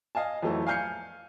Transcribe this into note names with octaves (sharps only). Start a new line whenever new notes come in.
D#5 F5 G#5 A5
F2 E3 F#3 A3
F5 G#5 F6 G6 C7 C#7